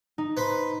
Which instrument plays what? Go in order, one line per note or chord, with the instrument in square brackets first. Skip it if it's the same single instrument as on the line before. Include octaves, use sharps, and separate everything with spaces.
[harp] D#4
[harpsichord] B4 C5 B5